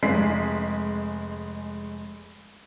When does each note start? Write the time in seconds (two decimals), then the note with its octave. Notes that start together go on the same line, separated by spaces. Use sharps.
0.03 F1 G#3 B6 C7